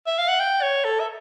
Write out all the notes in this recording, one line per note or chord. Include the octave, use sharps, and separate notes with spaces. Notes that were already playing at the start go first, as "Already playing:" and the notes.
E5
F5
F#5
G5
C#5
A4
E5